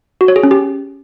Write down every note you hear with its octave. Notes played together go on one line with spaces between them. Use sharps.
F#4
C#5
G#4
C#4
G4